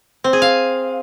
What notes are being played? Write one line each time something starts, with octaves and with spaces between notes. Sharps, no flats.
C4
G#4
F5